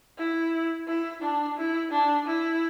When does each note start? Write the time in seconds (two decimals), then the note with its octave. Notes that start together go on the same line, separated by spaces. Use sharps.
0.18 E4
0.87 E4
1.22 D4
1.58 E4
1.92 D4
2.27 E4